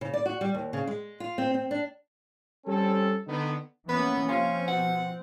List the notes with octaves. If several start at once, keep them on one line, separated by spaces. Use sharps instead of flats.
C#3
D5
F#4
G3
D#2
C#3
G#3
F4
C4
C4
D4
G3 C4 C#4 A4
D3 D#3 B3
E3 A#3 B3 C#4 B4
C3 F3 C4 C#4 F4
B2 F#5